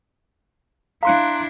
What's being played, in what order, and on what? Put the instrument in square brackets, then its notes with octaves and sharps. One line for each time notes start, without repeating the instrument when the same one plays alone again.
[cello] D4 E4 [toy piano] F5 [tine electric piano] A#5 C6 F#6